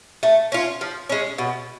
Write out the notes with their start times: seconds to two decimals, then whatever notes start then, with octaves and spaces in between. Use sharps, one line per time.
0.23 A3
0.52 C#4 F4
0.81 F3
1.09 G#3 C#4
1.38 B2